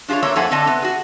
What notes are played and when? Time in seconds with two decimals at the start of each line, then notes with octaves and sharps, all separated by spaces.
0.08 D4 F4 G4 G#4 C#5
0.22 A3 A#3 C4 D4 C#5 E5
0.36 F2 A3 A#3 C5 F#5 G#5
0.51 D3 A3 C4 D4 D#5 A5
0.67 C3 B3
0.82 F#4 G#4